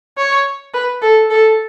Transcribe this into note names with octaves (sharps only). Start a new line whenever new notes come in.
C#5
B4
A4
A4